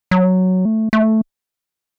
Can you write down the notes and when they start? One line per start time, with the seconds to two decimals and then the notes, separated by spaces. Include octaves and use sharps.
0.11 F#3
0.65 A3
0.93 A3